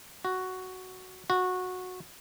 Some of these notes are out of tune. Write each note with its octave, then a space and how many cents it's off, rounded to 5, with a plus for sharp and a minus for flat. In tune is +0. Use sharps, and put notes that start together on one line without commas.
F#4 +5
F#4 -15